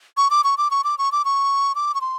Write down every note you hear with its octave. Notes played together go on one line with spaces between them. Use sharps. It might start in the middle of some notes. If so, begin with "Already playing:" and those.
C#6
D6
C#6
D6
C#6
D6
C#6
D6
C#6
D6
C#6
C6